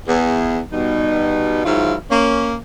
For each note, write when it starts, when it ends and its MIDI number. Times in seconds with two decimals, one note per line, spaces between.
0.08 0.59 40
0.08 0.59 68
0.72 1.63 47
0.72 1.63 55
0.72 1.63 63
1.65 1.95 44
1.65 1.95 51
1.65 1.95 54
1.65 1.95 64
1.65 1.95 65
1.65 1.95 77
2.11 2.55 58
2.11 2.55 61